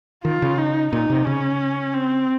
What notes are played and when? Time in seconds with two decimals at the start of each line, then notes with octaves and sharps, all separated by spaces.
0.24 D#3 F4
0.42 C#3
0.58 D#4
0.93 A#2 D#4
1.10 C3
1.26 C#3 C#4
1.94 C4